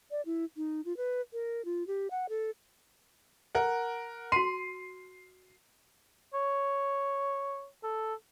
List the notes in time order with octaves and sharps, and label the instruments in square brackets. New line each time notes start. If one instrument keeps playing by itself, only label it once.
[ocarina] D5
E4
D#4
F4
B4
A#4
F4
G4
F#5
A4
[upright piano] A#4 F#5
[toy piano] F#4 C6 [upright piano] C7 D#7
[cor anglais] C#5
A4